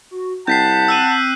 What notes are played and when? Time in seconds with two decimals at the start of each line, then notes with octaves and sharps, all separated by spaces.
0.11 F#4
0.47 C2 C4 F#5 A5 G6 B6 C7
0.88 E6 F#6 D#7